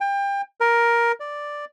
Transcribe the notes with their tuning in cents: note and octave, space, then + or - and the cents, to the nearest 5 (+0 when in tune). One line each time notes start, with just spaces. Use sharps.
G5 +30
A#4 +10
D5 +0